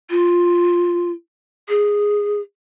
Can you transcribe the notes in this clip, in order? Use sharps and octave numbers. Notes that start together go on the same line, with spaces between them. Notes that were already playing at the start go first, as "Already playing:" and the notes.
F4
G#4